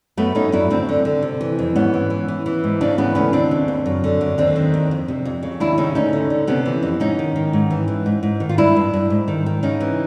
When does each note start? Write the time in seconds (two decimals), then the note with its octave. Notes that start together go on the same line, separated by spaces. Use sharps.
0.17 F#2 A3 B3
0.35 F#2 C#4 D#4
0.52 F#2 D4 E4
0.70 D2 C4 D4
0.89 D3
1.05 D3
1.22 C3
1.41 E3
1.59 F2
1.75 G#2 B3 C#4
1.94 E3
2.10 E3
2.28 E3
2.46 E3
2.64 G#2
2.81 C#3 C4 D4
2.98 E3 B3 C#4
3.15 D2 B3 C#4
3.33 D#2 C4 D4
3.51 C#3
3.68 D#2
3.86 F#2
4.04 D3
4.21 F#2
4.38 D#2 C4 D4
4.56 D#3
4.74 D#2
4.91 F2
5.08 C3
5.25 F2
5.43 C#3
5.60 D#2 D4 E4
5.78 C#3 C#4 D#4
5.95 D2 C#4 D#4
6.13 D3
6.30 D3
6.47 C3 B3 C#4
6.66 E3
6.83 F2
7.00 G#2 C#4 D#4
7.19 D#3
7.36 D#3
7.53 G#2
7.70 E3
7.88 E3
8.06 G#2
8.23 G#2
8.40 D#3
8.49 F4
8.58 G2 D4 E4
8.76 G2
8.94 G2
9.10 G#2
9.28 D#3
9.46 D#3
9.63 C#3 C#4 D#4
9.80 E3